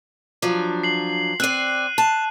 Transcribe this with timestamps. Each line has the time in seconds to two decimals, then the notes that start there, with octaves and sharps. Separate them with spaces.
0.42 F3 F#3 D4
0.83 C7 F#7
1.40 C4 D5 F#6 D#7
1.98 A5